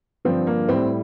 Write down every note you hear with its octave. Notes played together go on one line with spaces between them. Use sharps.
G2 D3 F3 C4
A#3
A2 G3 C4